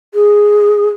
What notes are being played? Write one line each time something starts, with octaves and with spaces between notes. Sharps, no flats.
G#4